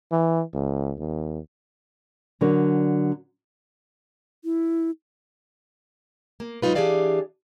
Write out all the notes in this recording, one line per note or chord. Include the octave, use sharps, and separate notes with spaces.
E3
C#2
D#2
D3 F#3 D4 A#4
E4
A#3
G#2 F#3 D#4 F4 B4
E3 D4 G4 G#4 D5 F5